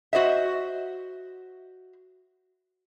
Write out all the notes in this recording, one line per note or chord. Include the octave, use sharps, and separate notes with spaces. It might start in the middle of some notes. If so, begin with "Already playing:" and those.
F#4 C5 D#5 E5